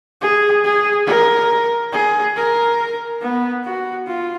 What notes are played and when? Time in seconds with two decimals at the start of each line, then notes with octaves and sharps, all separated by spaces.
0.21 G#4
0.64 G#4
1.06 A#4
1.92 G#4
2.36 A#4
3.21 B3
3.64 F#4
4.07 F4